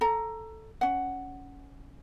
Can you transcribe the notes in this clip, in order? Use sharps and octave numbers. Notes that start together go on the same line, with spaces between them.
A4 A#5
C#4 F#5